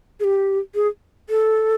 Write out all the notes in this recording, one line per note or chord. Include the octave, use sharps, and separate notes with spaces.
G#4
G4
G#4
A4